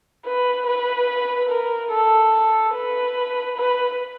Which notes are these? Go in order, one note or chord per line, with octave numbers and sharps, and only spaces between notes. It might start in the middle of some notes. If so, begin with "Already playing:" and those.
B4
B4
A#4
A4
B4
B4